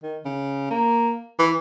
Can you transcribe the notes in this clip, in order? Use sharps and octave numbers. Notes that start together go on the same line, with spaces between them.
D#3
C#3
A#3
E3